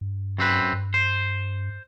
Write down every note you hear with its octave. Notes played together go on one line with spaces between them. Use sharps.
G2
F#2 C4 B4
G2
C5